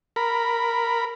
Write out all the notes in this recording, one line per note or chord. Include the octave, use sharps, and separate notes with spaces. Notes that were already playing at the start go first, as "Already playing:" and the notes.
A#4 B5